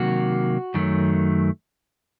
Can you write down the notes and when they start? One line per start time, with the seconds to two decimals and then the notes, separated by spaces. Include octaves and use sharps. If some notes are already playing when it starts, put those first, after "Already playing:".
Already playing: C3 D#3 F#3 A#3 F#4
0.74 F#2 D#3 F#3 A3